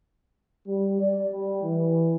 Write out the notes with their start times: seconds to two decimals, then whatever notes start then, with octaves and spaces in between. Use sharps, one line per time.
0.67 G3
1.00 D5
1.32 G3
1.63 E3